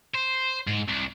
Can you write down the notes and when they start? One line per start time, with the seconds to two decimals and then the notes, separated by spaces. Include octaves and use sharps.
0.14 C5
0.67 G#2
0.88 C2